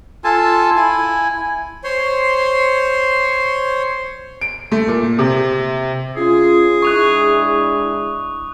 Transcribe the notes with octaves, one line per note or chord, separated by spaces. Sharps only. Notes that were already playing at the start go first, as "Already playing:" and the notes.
F4 A4 G#5 A5
E4 G#5
C5 C#5 C6
D7
A3
A#2
C3
C#4 F4 G#4
G#3 D4 E4 C#6 D#6 F#6